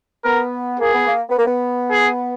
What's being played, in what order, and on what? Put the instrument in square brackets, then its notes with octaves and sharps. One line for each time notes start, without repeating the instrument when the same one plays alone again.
[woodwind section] B3 [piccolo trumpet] A#4
[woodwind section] A#3 [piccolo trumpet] G#4
[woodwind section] B3
A#3
B3
A#3
B3
[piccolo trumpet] G#4